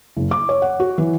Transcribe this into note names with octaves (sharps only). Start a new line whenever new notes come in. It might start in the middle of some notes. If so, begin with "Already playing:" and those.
F#1
D6
C#5
F#5
F#4
E3